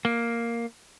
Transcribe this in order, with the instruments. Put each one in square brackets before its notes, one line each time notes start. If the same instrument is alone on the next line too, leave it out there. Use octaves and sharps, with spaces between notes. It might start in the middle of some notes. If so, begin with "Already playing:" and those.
[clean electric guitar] A#3